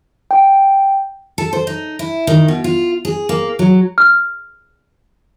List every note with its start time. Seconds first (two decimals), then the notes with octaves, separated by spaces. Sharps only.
0.31 G5
1.38 A4
1.53 C5
1.67 D#4
1.99 E4
2.27 D#3
2.48 B2
2.64 F4
3.05 G#4
3.29 A#3
3.59 F#3
3.98 F6